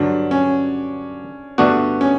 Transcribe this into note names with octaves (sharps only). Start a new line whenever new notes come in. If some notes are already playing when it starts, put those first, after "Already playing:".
Already playing: G2 D3 F#3 D4
C#4
G2 D3 A3 B3 D4 F#4
C#4